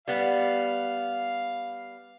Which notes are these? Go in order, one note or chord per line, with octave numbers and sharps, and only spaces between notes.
G3 B3 F5